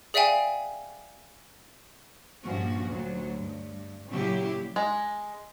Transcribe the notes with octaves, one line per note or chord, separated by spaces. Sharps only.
G#4 D5 E5 F5 G5 G#5
G2 A#2 F3 C#4 F#4
D2 F#3
G2
A#2 C#3 F#3 E4 G4
G#3